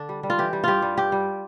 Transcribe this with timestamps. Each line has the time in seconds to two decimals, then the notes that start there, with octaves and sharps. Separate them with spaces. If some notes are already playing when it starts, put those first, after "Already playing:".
Already playing: D3 D4
0.09 G3
0.23 G3
0.30 F4
0.38 E3 G4
0.53 G3
0.64 G2 F4 G4
0.82 G3
0.97 G2 G4
1.12 G3